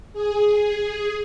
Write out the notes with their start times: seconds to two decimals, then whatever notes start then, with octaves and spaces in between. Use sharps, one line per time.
0.13 G#4